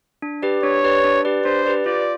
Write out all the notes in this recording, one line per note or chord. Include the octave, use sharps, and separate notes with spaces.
D4
G4 B4 D5
D4 C#5
G4 B4 D5
D4
G4 B4 D5
D4 C5
G4 B4 D5
F4 D5